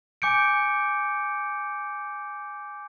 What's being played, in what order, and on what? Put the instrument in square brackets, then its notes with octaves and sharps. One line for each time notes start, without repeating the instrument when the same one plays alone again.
[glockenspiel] G#5 D6 G6 C#7 D7